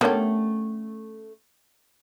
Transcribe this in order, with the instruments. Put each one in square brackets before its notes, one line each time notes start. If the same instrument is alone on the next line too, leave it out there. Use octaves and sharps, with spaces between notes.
[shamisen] D3 G4 [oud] A3 C#4 A4 [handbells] B3 A#4 C#5